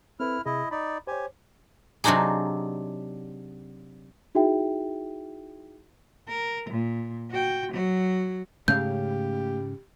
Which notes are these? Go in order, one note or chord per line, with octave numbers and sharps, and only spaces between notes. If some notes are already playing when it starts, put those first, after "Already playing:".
C4 E4 A4 B4 F6
C3 E4 G#4 D#5
D#4 D5 B5
G4 C5 C#5 G#5
C3 F#3 C4 D4 D#4 G#4
D#4 E4 F#4 G#4 E5 G5
A#4
A#2
F#4 G5
F#3 F#4
G#2 C#3 A3 C#4 G4 F5 G6